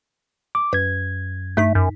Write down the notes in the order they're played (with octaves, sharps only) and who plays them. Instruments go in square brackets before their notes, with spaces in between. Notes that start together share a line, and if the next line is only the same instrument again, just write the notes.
[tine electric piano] D6
[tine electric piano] F#2 G#6 [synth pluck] B4
[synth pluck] G2 D#4 B6 [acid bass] A3
[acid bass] F#2